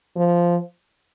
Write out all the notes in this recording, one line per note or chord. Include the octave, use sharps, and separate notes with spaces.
F3